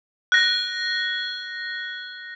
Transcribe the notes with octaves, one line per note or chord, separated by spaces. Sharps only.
F#6 A#6